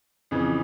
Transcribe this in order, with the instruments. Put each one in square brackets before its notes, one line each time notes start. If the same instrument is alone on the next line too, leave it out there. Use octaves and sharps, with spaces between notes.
[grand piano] F2 C#3 E3